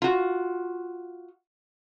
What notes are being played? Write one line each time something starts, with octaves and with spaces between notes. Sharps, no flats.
F4 F#4